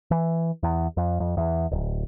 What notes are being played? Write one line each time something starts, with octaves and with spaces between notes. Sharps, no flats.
E3
E2
F2
F2
E2
D1